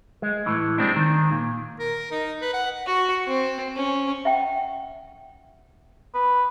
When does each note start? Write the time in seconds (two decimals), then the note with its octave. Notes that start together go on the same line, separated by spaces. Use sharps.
0.22 G#3
0.46 A2 E3
0.78 G3 G#3 A#3 C4 D4
0.96 D#3
1.32 A#2
1.80 A#4
2.12 D#4
2.42 B4
2.54 F#5
2.87 F#4
3.27 C4
3.76 C#4
4.25 E5 F#5 G5
6.14 B4